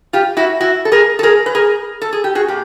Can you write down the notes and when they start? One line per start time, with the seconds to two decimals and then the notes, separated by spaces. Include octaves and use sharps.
0.13 F4 G4
0.37 E4 F#4
0.60 E4 F#4
0.85 A4
0.92 G#4 A#4
1.19 A4
1.23 G#4 A#4
1.46 B4
1.55 G#4 A#4
2.02 A4
2.13 G#4
2.24 G4
2.35 F#4 G#4
2.48 A#2 G4